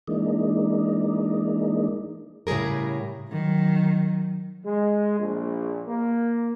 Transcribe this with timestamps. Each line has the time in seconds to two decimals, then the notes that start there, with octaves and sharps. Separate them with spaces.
0.08 E3 G#3 A#3 D4 D#4
2.47 A2 C#3 G3 G#4 A#4
3.30 D#3 F#3
4.65 G#3
5.19 A#1
5.88 A#3